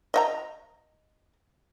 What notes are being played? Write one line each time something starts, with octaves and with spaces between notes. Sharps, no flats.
D#5 E5 A#5